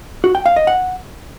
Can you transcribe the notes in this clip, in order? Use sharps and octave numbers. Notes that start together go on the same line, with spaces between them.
F#4
G5
F5
D#5
F#5